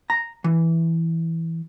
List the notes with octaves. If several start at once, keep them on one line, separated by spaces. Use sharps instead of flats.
A#5
E3